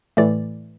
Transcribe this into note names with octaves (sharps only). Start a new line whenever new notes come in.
A2 E3 A3 D5